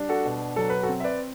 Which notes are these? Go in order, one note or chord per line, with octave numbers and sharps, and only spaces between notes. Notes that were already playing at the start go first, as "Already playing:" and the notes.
Already playing: G3 D4
F#4 A4
B2
F#3 A4
B4
F#4 A4
C4
E5
B4 D5